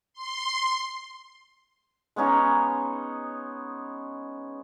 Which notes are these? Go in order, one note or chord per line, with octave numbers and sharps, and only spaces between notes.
C6
G#3 B3 C#4 D#4